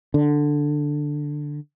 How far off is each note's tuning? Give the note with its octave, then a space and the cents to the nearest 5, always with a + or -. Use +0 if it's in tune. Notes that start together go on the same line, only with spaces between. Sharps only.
D3 +5